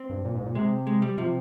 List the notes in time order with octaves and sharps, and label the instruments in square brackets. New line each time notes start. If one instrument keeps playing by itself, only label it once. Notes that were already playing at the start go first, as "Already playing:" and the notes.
Already playing: [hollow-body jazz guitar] C4
[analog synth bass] G2
A#2
G#2
A#2
[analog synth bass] C3 [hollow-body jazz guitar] G#3
[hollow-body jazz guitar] G#3
G3
[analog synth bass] C3 [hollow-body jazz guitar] F3